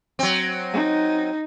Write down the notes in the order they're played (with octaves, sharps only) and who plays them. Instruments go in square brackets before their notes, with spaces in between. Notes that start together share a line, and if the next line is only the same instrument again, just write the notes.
[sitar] F#3 C4
[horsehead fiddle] D#4